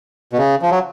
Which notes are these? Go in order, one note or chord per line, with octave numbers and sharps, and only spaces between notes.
B2
C#3
F3
F#3